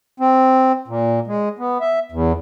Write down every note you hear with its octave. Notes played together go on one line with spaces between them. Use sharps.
C4
A#2
G#3
B3
E5
E2